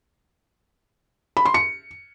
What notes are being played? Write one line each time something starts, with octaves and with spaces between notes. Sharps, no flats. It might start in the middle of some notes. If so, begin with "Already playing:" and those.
B5
C6
C#7